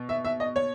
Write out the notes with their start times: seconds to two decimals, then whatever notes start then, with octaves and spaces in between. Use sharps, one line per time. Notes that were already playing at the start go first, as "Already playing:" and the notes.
Already playing: B2
0.09 E5
0.25 E5
0.40 D#5
0.56 C#5